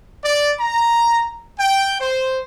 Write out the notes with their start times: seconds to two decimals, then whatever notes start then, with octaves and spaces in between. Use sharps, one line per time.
0.24 D5
0.60 A#5
1.59 G5
2.01 C5